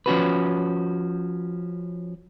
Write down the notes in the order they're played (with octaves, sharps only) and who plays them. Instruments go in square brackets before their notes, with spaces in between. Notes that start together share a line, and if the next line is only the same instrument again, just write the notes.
[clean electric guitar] F3 C#4 F#4 B4